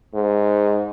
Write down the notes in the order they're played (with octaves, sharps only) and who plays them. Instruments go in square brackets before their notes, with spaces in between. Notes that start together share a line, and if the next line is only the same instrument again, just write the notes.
[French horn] G#2